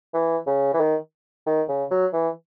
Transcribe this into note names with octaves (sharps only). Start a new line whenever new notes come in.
E3
C#3
E3
D#3
D#3
C#3
F#3
E3